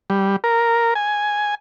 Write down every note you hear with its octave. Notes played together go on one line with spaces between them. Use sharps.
G3
A#4
G#5